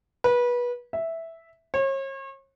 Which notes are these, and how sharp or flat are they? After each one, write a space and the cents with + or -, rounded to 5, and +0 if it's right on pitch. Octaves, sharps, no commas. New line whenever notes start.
B4 -25
E5 -5
C#5 -40